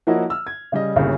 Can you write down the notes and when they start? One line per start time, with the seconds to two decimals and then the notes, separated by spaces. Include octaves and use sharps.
0.07 F3 A#3 E4 F#4 C#5 D#5
0.30 E6 F6
0.47 G#6
0.72 C#3 G3 D#5
0.96 G1 C2 A#2 C#3